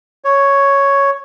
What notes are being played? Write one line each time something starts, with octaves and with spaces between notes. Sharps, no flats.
C#5